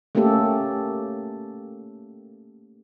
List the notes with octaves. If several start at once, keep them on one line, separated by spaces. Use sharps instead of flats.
A3 A#3 C#4 G4 A4